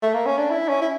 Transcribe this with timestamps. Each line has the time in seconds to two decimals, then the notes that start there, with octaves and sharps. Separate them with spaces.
0.02 A3
0.14 A#3
0.26 C#4
0.38 D4
0.50 E4
0.68 C#4
0.81 E4